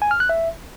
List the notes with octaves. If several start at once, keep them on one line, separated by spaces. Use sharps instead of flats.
G#5
F6
F#6
E5